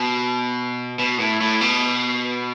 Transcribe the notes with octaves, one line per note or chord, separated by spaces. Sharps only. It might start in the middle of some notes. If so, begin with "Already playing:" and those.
Already playing: B2
B2
A2
A2
B2